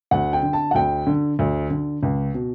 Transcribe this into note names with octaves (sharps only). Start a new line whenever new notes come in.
D2 F#5
G5
D3
A5
F#5
D2 G5
D3
D2
D3
C#2
B2